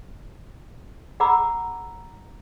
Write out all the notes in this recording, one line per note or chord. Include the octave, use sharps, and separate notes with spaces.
G#4 F#5 A#5 B5 D6 E6